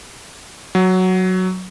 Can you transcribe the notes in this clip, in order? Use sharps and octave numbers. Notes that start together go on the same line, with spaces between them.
F#3